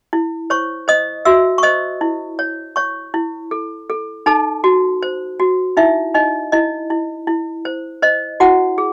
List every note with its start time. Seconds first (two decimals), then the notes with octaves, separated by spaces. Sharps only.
0.13 E4
0.50 C5 C#5 C#6
0.88 C5 D#5 D#6
1.25 F#4 E5 E6
1.58 C#6
1.63 C5 D#5 D#6
2.01 E4
2.39 C#5
2.76 C#5 C#6
3.14 E4
3.51 A4
3.90 A4
4.26 D#4 A4 A5
4.64 F#4
5.03 C5
5.40 F#4
5.77 D#4 E4 E5
6.14 D#4 D#5
6.52 E4 D#5
6.90 E4
7.27 E4
7.65 C5
8.03 C5 D#5
8.40 E4 F#4 F#5
8.78 G#4